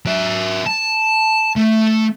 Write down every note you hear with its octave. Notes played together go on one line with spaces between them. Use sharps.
F#3 E5
A5
A3